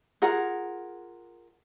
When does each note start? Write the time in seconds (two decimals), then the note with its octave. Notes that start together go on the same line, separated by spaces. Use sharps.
0.22 F4 G#4 A#4 F#5